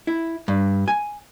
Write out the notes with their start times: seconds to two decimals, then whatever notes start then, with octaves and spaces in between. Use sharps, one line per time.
0.07 E4
0.48 G2
0.88 G#5